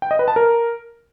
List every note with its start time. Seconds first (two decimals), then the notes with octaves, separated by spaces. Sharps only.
0.02 G5
0.11 D#5
0.19 B4
0.28 A5
0.36 A#4